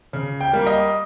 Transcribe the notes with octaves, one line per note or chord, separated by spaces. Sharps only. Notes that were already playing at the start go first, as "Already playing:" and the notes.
C#3
G5
G3 A#3
D#5